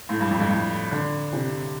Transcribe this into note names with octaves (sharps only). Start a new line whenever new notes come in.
A2
G2
F2
G2
A2
D3
C3